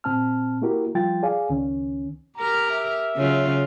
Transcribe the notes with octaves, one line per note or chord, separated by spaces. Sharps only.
A#2 C4 A5 F6
A#3 E4 F#4 G4 A#4
F3 G3 F4 G5 A6
G#4 D5 F5 G#5
C#2 D#3 C#4
G4 A#4 A#5
E5
C#3 F#3 F4